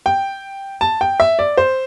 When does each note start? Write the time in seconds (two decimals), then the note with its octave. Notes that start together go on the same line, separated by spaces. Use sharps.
0.06 G5
0.81 A5
1.01 G5
1.20 E5
1.39 D5
1.57 C5